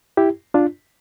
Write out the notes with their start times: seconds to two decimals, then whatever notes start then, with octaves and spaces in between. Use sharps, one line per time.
0.17 E4 G4
0.54 D4 F4